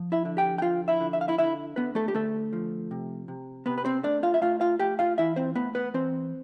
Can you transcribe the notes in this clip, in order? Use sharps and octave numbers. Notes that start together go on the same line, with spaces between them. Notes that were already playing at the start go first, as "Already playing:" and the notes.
Already playing: F3
E4 E5
D3
G4 G5
G5
F3 F4 F5
E4 E5
D3
E5
F5
E4 E5
D3 E4 E5
D3 B3 B4
A3 A4
G4
D3 A3 A4
F3
C3
C3
C3 B3 B4
B4
C4 C5
A3 D4 D5
F4 F5
E5
A3 F4 F5
F4 F5
A3 G4 G5
F4 F5
E3 E4 E5
C4 C5
A3 B3 B4
B3 B4
E3 C4 C5